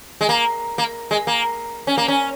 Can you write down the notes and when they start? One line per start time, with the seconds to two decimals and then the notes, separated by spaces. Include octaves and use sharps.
0.21 G#3
0.29 A#3
0.78 A#3
1.11 G#3
1.27 A#3
1.87 C#4
1.97 A#3
2.08 C#4